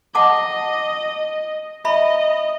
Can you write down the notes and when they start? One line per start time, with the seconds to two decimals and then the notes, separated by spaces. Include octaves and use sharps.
0.15 D#5 F#5 A5 D6
1.85 D#5 E5 B5